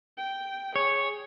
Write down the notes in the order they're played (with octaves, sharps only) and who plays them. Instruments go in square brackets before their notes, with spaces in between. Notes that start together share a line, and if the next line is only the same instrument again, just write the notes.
[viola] G5
[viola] G#4 [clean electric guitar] C#5